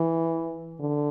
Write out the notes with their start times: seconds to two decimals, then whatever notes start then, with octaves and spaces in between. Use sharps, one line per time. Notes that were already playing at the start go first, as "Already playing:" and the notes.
Already playing: E3
0.80 D3